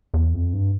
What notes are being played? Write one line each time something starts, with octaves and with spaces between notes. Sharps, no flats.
E2
F2
G2